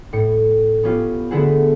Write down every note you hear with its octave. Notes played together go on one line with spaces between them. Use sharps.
A2 C#7
B3 C#4 F4 G4
D3 A3 B3 E4 F#4 G#4